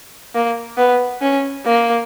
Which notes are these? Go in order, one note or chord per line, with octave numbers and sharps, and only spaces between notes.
A#3
B3
C#4
A#3